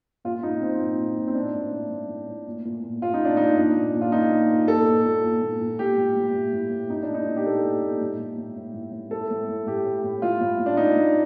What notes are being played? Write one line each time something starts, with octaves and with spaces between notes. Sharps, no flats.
A#2 F4
A#2 D#4
A#2 C4
A#2
A#2
A#2
C4
A2 D4
A2
A2
A2
A2
A2
A#2
A#2
A#2
A#2 F4
D#4
A#2 D4
A#2 D#4
A#2 D4
A#2
A#2
F4
A#2 D#4
A#2
A#2
A#2 A4
A#2
A#2
A#2
A#2
A#2
A2 G4
A2
A2
A2
A2
A2
A#2 D#4
D4
A#2
D#4
A#2
G4
A#2 A4
A#2
A#2
A2
A2
A2
A2
A2
A2
A2 A4
A2
A2
A2 G4
A2
A2
A2 F4
A2
A2
D4
A2 D#4
A2